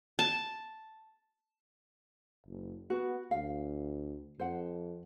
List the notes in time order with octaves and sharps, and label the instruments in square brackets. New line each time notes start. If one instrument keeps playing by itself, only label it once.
[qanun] A5
[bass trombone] F#1
[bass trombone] B3 [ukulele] F#4
[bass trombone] D2 [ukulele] F5
[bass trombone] F2 [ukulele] C5 F#5